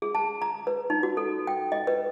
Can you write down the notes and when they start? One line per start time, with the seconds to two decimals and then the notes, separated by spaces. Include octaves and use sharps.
0.02 G#4
0.15 A5
0.42 A#5
0.67 B4
0.90 D#4
1.03 F#4
1.17 A4
1.47 G5
1.72 D#5
1.87 B4